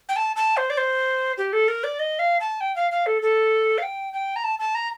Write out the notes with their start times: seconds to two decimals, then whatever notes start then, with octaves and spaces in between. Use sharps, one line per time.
0.09 G5
0.16 A5
0.36 A5
0.57 C5
0.70 D5
0.77 C5
1.38 G4
1.53 A4
1.68 A#4
1.84 D5
1.99 D#5
2.19 F5
2.40 A5
2.61 G5
2.76 F5
2.91 F5
3.06 A4
3.22 A4
3.78 F5
3.83 G5
4.13 G5
4.36 A#5
4.44 A5
4.59 A5
4.75 A#5